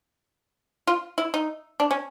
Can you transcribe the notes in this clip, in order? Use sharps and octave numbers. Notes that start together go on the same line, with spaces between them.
F4
E4
D#4
D4
C#4